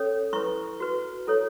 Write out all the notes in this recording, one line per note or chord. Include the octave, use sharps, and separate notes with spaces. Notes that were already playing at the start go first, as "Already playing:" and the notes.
Already playing: C#4 A4 C#5
E4 B4 C#6
F#4 B4
E4 A4 C#5